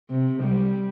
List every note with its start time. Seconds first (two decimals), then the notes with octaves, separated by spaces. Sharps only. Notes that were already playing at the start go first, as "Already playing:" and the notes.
0.10 C3
0.42 G3